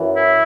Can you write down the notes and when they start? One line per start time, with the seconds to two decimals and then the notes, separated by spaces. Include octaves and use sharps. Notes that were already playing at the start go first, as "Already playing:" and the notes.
Already playing: F#2 E3
0.15 E4 E5